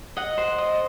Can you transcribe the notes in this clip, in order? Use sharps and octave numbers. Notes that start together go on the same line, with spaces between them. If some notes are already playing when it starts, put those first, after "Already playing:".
D#5 F#5
C5
D#5